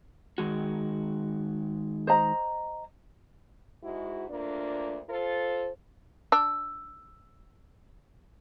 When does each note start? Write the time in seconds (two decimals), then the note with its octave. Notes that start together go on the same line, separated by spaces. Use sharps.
0.38 D#3 G#3 F#4
2.07 C5 D#5 A#5
3.83 G#2 G#3 E4 F#4
4.29 D2 A#3 D4 F4 D5
5.10 F4 A4 C5
6.32 D4 E6